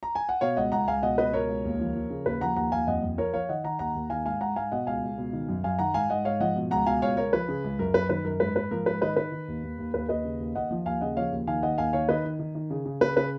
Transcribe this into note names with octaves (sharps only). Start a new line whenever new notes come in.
A#5
G#5
F#5
B2 C#5 F5
C#2 D#5 F#5
C#2 F#5 A#5
C#2 F5 G#5
B2 D#5 F#5
C#2 B4 D#5
B2 A#4 C#5
C#2
D#2
F3
F3
C#3
D#2 B4
F3 F#5 A#5
D#2 F#5 A#5
D#2 F5 G#5
F2 D#5 F#5
F2
F3 A#4 C#5
F3 C#5 F5
D#3 D#5 F#5
D#3 F#5 A#5
D#2 F#5 A#5
D#2
D#3 F5 G#5
G#2 F5 G#5
G#2 F#5 A#5
G#2 F5 G#5
B2 D#5 F#5
C#2 F5 G#5
C#2
B2
D#3
F#2
F#2 F5 G#5
D#3 F#5 A#5
G#2 F5 G#5
G#2 D#5 F#5
G#2 C#5 F5
F3 D#5 F#5
B2
C#2 F#5 A#5
B2 F5 G#5
C#2 C#5 F5
C#2 A#4 C#5
F3 B4
C#3
C#2
F#2 A#4
F#2 B4
D#3 B4
F#2 A#4
G#2 B4
G#2 B4
F3 A#4
G#2 B4
D#3 B4 D#5
D#3 B4
D#3
D#2
D#2
D#2
D#2 B4
D#2 B4 D#5
C#3
D#2
D#2 D#5 F#5
F3
D#2 F5 G#5
C#3 D#5 F#5
F3 C#5 F5
D#2
D#3 F5 G#5
D#3 D#5 F#5
D#2 F5 G#5
D#3 C#5 F5
D#3 B4 D#5
D#3
D#3
D#3
C#3
C#3
C#3 B4
C#3 B4